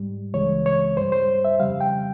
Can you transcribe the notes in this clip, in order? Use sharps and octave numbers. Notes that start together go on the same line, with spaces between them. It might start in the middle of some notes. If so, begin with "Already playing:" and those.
Already playing: G#2 G3
C#2 C#3 E3 G#3 C#5
C#5
G2 G3 C5
C5
E5
F2 C#3 G3 F5
G5